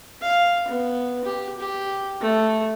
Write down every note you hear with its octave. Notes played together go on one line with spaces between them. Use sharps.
F5
B3
G4
G4
A3